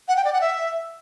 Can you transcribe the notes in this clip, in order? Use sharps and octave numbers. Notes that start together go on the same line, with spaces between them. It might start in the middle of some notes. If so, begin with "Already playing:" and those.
F#5
G5
D5
F#5
E5